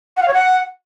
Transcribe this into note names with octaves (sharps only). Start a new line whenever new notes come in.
F#5
F5
C#5
F#5